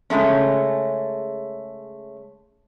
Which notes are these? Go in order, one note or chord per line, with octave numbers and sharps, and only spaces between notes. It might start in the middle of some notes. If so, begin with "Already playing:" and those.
C#3 G#3 A3 C#4